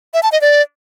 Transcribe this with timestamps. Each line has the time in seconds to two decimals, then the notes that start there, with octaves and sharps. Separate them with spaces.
0.14 E5
0.23 A5
0.32 D#5
0.41 D5